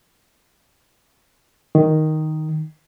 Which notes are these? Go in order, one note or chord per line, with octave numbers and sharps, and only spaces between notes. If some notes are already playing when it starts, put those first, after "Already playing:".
D#3